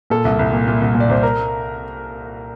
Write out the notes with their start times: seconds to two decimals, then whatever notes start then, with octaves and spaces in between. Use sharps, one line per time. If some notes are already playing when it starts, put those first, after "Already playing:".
0.10 A#2 A4
0.25 C2
0.39 C2
0.53 A#2
0.67 A#2
0.81 C2
0.95 A#2
1.00 D5
1.09 C2 C5
1.23 A#4